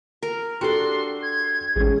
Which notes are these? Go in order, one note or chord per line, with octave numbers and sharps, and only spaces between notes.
A#4
D4 F#4 G4 A4 C6
G#6
A1 G#3 C#4